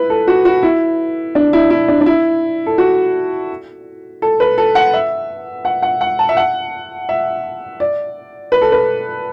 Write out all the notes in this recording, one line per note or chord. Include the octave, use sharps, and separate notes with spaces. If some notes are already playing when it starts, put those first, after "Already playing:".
Already playing: E4 B4
A4
F#4
F#4
E4
D4
E4
E4
D4
D4
E4
A4
F#4
A4
B4
A4
F#5
E5
F#5
F#5
F#5
A5
E5
F#5
E5
D5
B4
A4
B4